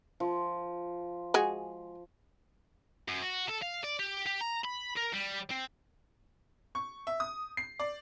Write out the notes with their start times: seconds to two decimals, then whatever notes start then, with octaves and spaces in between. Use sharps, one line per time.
0.20 F3
1.34 G#3 F#4 G#4
3.08 F#2
3.22 F#4
3.49 A4
3.62 F5
3.84 D5
3.99 G4
4.27 G4
4.41 A#5
4.65 B5
4.97 A#4
5.14 G3
5.50 C4
6.75 C#6
7.07 E5
7.20 D#6
7.57 C7
7.79 D5